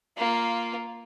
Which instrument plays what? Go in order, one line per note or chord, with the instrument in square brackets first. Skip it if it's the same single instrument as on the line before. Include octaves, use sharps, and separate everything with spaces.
[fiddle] A#3 F4